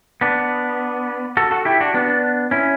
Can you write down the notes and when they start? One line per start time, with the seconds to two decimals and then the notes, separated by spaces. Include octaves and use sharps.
0.21 B3 D4
1.37 F#4 A4
1.51 F#4 A4
1.65 E4 G4
1.81 D4 F#4
1.94 B3 D4
2.51 C#4 E4